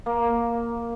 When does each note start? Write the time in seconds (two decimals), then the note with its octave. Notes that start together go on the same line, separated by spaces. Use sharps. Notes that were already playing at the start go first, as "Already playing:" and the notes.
0.06 A#3